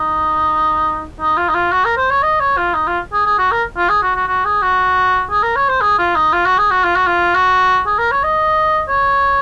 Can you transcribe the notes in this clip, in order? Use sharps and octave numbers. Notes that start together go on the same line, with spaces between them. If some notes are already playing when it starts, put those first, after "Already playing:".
Already playing: D#4
D#4
F4
D#4
F4
F#4
A#4
C5
C#5
D#5
C#5
F4
D#4
F4
G#4
G#4
F#4
A#4
F4
G#4
F#4
F#4
F#4
G#4
F#4
G#4
A#4
C#5
C5
G#4
F4
D#4
F4
F#4
G#4
F#4
F4
F#4
F4
F#4
G#4
A#4
C#5
D#5
C#5